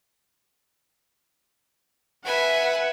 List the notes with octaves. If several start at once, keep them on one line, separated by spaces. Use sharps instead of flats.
B4 E5 F#5 G#5